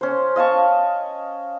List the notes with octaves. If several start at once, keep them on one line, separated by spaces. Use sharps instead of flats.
C#4 C5
D#5 F5 A5 C#6